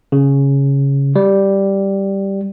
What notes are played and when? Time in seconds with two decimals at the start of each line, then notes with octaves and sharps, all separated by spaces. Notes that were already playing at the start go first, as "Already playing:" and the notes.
0.12 C#3
1.16 G3